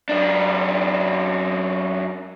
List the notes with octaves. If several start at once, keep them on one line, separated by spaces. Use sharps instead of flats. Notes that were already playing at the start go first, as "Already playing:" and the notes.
F#2 D4